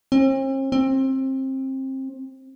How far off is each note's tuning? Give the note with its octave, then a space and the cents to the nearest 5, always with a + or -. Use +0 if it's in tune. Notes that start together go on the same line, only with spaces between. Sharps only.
C4 +45
C4 +25